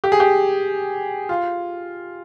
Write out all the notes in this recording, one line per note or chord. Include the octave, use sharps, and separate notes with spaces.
G4
G#4
G4
F4